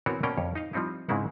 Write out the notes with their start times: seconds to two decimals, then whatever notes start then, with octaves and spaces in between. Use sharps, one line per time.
0.06 E3 B3 C4 F#4 A#4 C#5
0.23 B2 A#3 C#4 D5 G5 A#5
0.38 F2 C#5
0.55 D#4 D#5 F5
0.73 F3 G3 C4 D#4 E4
1.09 G#2 C#3 G#3 C4 E4 F#5